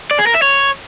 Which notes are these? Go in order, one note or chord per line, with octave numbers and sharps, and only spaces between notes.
D5
G#4
A#4
E5
C#5